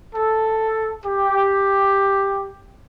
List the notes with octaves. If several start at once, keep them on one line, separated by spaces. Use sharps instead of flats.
A4
G4